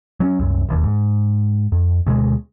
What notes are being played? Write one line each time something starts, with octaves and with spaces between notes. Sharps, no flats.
F#3 C4 C#4
C2 F#2
E1 D#2
G#2
F2
D2 B2 G3 G#3